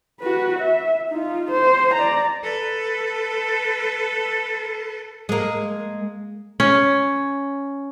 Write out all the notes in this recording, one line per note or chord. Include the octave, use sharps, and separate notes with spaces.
F#4 B4
E5
D#4 F4
C5
D5 A#5
A4 B4
G#3 A#3
C#4